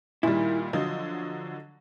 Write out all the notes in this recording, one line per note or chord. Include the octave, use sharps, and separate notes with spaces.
A#2 D#3 G3 E4
D3 F3 F#3 D#5